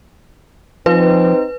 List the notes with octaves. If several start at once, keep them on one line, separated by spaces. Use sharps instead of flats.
F3 C4 D#4 B4